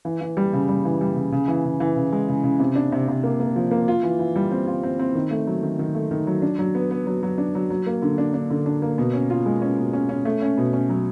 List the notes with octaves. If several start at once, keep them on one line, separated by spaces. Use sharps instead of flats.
E3
E3
G3
C#3
G3
E3
G3
C#3
C#3
E3
C#3
E3
C#3
G#3
C#3
C#3
C3
D4
C3
C3
A#3
A#3
F3
A#3
F4
E3
E3
G3
C4
F4
C4
C4
D#3
A3
F#3
D#3
D#3
A3
D#3
F#3
D4
F#3
B3
B3
F#3
F#3
D4
F#3
F#3
A#3
D3
D4
D4
D3
D4
A#3
B2
C#4
F4
G#3
C#4
B2
C#4
C#4
A3
C#4
B2
C#4
F#3